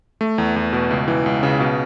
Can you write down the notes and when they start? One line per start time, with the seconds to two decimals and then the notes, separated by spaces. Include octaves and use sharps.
0.21 A3
0.38 E2
0.56 E2
0.73 B2
0.91 C#2
1.08 E3
1.26 C#2
1.43 C#3
1.60 B2